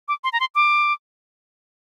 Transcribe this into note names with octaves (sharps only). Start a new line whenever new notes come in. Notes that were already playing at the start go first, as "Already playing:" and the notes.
D6
C6
A#5
C6
D6